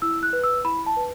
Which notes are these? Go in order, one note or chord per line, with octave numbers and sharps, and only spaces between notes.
E4 E6
F#6
B4
E6
E4 B5
A5
B4